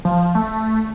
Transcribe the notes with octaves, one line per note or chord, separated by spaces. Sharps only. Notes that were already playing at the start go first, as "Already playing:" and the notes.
F3
A3